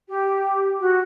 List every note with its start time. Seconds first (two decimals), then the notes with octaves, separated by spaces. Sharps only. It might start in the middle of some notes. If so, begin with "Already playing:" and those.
0.08 G4
0.80 F#4